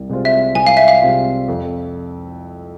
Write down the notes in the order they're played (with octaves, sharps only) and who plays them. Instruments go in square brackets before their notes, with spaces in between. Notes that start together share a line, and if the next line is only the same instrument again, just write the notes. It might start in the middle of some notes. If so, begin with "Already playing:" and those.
Already playing: [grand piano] C2
C3 G#3 C4 F4
[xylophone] E5
[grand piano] C2 [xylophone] G#5
[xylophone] F5
E5
F5
[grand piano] C3 G#3 C4 F4
F2